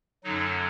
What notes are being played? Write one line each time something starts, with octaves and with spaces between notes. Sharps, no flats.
F#2 D3 F#3 D#4